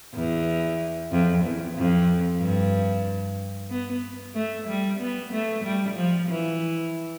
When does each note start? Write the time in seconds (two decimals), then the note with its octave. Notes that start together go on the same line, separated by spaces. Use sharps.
0.14 E2
1.11 F2
1.44 E2
1.76 F2
2.40 G2
3.70 B3
4.35 A3
4.67 G3
4.99 B3
5.32 A3
5.64 G3
5.96 F3
6.28 E3